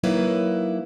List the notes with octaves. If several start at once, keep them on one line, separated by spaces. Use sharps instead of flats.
F#3 A#3 D#4 E4 A#4 B4